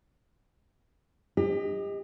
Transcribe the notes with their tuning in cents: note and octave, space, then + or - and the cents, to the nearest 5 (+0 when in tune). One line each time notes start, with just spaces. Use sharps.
G4 +35 D#5 +0